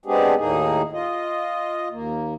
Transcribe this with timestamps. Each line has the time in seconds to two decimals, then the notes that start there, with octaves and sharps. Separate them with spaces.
0.06 G#3 B3 C4 D4 G4 G#4
0.37 D#2 A2 A#3 D#4 G#4
0.92 F4 D#5
1.91 D#2 A#3